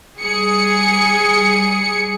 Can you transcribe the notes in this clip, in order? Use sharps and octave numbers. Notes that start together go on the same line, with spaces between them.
G3 G#4 C#7